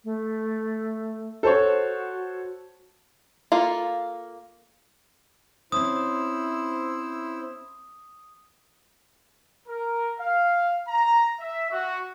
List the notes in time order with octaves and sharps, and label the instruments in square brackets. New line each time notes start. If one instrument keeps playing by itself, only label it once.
[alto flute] A3
[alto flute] F#4 [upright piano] A4 C5 C#5
[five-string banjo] A#3 F4 A4
[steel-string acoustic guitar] C4 C#4 [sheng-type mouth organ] E4 C5 E6 [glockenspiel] D#6
[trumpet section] A#4
F5
A#5
E5
F#4